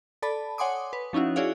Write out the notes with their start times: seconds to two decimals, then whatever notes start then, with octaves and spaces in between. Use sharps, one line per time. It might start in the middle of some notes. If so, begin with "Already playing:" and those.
0.22 A4 D5 A5 B5
0.58 C#5 F#5 G#5 C6 D6 D#6
0.93 B4
1.13 F3 C#4 D#4 E4 F#4
1.36 E4 F#4 G#4 C#5 D5 F5